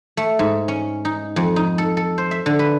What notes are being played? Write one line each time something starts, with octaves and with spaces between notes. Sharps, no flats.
A3
G#2
C#4
D#4
F2
D#4
A4
A4
C5
E5
D3
B4